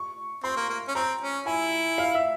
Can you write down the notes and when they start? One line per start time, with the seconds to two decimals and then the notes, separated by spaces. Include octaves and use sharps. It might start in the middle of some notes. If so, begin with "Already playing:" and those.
Already playing: C#6
0.44 C4 C6
0.57 A#3
0.70 A#3
0.88 C#4
0.95 C4 A#5
1.21 C#4
1.46 E4 G#5
1.98 F5
2.15 E5